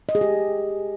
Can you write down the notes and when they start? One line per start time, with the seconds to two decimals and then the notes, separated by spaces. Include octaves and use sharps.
0.09 D#5
0.15 G#4
0.21 G4